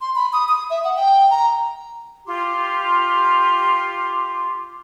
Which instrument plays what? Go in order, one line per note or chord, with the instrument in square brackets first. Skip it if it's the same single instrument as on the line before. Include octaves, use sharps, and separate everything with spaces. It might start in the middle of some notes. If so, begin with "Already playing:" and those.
[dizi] C6
B5
D#6
D#6
E5
F#5
G5
A#5
[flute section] F4 G4 C6 D6